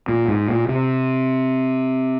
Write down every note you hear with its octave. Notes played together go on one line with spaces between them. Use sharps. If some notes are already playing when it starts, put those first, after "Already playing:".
A#2
G#2
A#2
C3